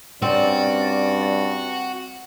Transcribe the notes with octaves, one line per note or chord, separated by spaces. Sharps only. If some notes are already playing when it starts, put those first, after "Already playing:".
G2 C4 C#4 F#4 D5